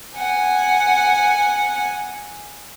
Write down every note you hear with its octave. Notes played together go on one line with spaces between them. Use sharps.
F#5 G#5